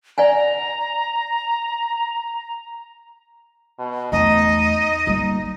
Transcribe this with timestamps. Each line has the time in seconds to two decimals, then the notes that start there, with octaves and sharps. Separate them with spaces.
0.18 D5 F#5 G#5 A#5
3.79 B2
4.12 E2 A3 D#4 D#5
5.07 G3 A#3